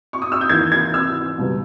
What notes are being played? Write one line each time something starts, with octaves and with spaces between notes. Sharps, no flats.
C#6
D#6
E6
G6
E2 D#3 A#3 G#6
G#6
E6
C#2 B2 G3